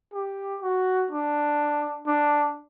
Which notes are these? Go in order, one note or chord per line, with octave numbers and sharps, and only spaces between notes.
G4
F#4
D4
D4